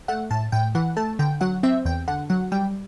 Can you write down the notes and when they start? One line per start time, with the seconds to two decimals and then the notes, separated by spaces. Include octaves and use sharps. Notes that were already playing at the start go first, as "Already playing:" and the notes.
0.08 A3 F#5
0.31 A2 A5
0.52 A2 G5
0.75 E3 F#5
0.97 A3 A5
1.19 D3 G5
1.41 F#3 F#5
1.63 C4 E5
1.85 E2 G5
2.08 D3 F#5
2.30 F#3 F#5
2.52 G3 G5